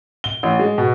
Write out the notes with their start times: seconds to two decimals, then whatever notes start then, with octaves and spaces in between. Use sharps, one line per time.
0.24 G7
0.43 A1
0.59 G#3
0.78 B2